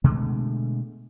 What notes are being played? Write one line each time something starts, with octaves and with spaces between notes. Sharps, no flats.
B2 D3 G#3 A3